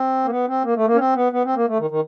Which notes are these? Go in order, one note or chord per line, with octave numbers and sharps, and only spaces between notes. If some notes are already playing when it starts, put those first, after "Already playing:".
Already playing: C4
A#3
B3
C4
A#3
A3
A#3
C#4
C4
B3
B3
C4
A#3
A3
D#3
D#3